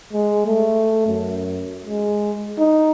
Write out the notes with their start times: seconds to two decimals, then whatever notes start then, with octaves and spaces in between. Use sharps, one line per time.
0.13 G#3
0.46 A3
1.08 F#2
1.86 G#3
2.59 D#4